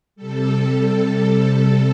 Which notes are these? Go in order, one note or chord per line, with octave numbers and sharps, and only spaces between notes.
C3 G3 A4